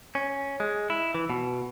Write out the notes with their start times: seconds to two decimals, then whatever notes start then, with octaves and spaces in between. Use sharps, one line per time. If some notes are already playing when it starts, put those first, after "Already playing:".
0.15 C#4
0.60 G#3
0.90 E4
1.14 E3
1.30 B2